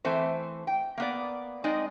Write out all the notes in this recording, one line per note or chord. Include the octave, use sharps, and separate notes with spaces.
E3 A3 C4 C5
G5
A#3 B3 D5
G#3 C4 D#4 D5 D#5